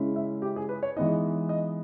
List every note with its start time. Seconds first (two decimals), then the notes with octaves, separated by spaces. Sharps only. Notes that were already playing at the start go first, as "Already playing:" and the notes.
Already playing: C#3 G#3 C#4 E4
0.16 E5
0.42 G4
0.56 G#4
0.69 B4
0.83 C#5
0.96 E3 G#3 B3 D#4 D#5
1.49 D#5